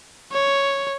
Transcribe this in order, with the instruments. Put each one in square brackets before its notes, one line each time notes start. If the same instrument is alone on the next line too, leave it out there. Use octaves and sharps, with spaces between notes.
[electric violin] C#5